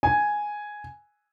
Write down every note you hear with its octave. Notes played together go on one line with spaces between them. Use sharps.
G#5